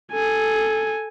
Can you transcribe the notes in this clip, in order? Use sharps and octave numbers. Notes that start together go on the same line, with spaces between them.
A4 G#5